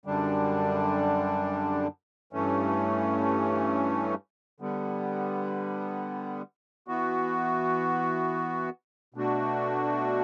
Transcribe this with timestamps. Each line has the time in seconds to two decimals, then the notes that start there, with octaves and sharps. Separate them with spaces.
0.06 F#2 D3 G3 D4
2.33 G2 E3 A3 C#4
4.60 D3 G3 B3
6.88 E3 B3 F#4
9.14 B2 A3 D4 F#4